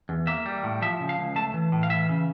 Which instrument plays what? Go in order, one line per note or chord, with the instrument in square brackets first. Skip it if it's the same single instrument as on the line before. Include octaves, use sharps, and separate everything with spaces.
[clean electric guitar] E2
A#3 E5
G3
A2
F3 E5
C#3
F5
C#2
A3 A5
E3
A2
F5
E3 E5
C#3